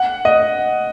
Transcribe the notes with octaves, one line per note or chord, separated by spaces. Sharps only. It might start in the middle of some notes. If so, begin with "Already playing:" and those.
Already playing: F#5
D#5